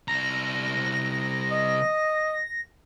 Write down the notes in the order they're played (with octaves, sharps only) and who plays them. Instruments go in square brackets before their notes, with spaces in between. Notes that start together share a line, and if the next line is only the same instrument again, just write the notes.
[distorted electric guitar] C2 A#5 [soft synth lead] A#6
[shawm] D#5